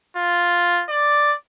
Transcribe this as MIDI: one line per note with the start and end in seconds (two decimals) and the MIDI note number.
0.17 0.84 65
0.90 1.34 74